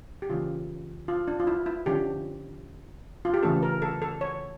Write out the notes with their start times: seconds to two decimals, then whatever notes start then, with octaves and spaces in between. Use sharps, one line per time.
0.22 G4
0.30 C#3 E3 A#3 C#4 F4
1.08 F4
1.28 D4
1.40 F4
1.47 E4
1.66 E4
1.86 D3 F3 C#4 G4
3.25 F4
3.34 G4
3.43 C#3 E3 A3 C#4 A4
3.63 A#4
3.82 A4
4.02 A4
4.21 C#5